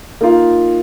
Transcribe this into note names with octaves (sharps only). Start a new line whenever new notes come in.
A#3 D#4 F4